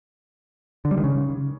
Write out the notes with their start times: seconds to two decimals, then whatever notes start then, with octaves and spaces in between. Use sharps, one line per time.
0.85 D3
0.91 G3
0.97 D#3
1.04 C#3